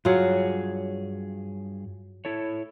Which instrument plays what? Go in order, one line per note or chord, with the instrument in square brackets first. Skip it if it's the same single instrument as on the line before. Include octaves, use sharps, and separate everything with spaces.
[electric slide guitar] G2 G#4 C#5 [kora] F#3 F4
[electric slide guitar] E4 A4 C#5